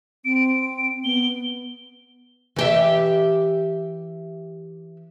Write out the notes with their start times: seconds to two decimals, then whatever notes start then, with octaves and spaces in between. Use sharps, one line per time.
0.25 C4 D7
1.04 B3 G7
2.56 E3 G4 E5